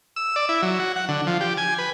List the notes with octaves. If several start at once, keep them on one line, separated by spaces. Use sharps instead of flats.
E6
D5
E4
F#3
F#4
F#5
D3
F3
G4
G#5
B4